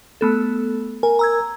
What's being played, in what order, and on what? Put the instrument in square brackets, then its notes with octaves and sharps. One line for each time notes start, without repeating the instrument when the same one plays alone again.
[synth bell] A3 B3 A4
[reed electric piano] A#4 [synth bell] G#5
[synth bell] A#5 E6 G#6